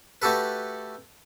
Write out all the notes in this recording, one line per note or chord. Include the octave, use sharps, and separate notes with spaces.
A3 F#4 G4 A4 B4